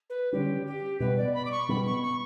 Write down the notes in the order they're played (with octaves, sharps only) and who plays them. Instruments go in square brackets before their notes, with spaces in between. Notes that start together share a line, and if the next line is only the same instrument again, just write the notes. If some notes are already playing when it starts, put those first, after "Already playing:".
[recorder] B4
[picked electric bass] D3 G3 C#4 [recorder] G4
[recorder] G4
[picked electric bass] B2 G3 B3 [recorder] B4
[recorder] D5
B5
D6
C#6
[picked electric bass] B2 G3 B3 [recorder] B5
[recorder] C#6
C#6